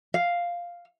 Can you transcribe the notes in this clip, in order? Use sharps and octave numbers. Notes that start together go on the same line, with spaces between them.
F5